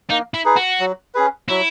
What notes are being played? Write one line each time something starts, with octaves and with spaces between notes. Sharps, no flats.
A#3 D#4
E4
D#4 G#4 B4
F#4
F#3
C#4 G#4 B4
F#3 E4